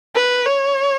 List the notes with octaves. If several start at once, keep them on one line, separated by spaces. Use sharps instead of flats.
B4
C#5